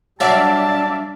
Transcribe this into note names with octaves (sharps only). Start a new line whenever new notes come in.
F#3 G3 D4 D5 E5 F5 A5